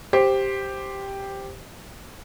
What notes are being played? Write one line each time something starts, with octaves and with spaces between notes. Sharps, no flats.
G4 C5